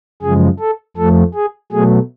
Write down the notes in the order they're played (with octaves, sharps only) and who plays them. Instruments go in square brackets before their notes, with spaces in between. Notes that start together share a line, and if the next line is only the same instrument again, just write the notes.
[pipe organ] F#2 C#3 F3 G#3 G#4
A4
F2 F3 A3 A4
G#4
B2 F#3 A3 G#4